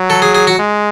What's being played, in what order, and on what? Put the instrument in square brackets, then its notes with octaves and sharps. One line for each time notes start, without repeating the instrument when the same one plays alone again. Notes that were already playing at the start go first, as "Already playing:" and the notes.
Already playing: [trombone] F#3
[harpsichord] A4
G#4
G#4
F#4
[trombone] G#3